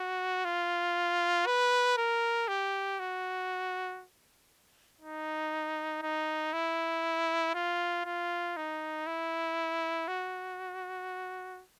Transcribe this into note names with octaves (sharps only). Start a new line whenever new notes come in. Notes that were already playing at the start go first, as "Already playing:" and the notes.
Already playing: F#4
F4
B4
A#4
G4
F#4
D#4
D#4
E4
F4
F4
D#4
E4
F#4